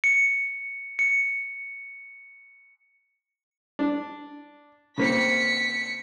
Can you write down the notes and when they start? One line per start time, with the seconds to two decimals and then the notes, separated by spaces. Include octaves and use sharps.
0.04 C#7
0.99 C#7
3.79 D4
4.98 C#3 A#3 C4 B6 C#7